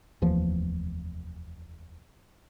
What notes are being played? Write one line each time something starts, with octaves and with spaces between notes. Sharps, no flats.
F1 D#2 E3 F3